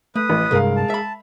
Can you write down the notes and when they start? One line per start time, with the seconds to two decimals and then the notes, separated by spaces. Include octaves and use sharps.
0.15 A3 B4 D#6
0.30 A1
0.51 C2 G2 G#3 A#4 F5
0.77 A5
0.90 E5 B5